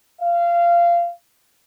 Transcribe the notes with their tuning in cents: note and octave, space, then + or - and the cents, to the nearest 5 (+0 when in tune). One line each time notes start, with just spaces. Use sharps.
F5 -20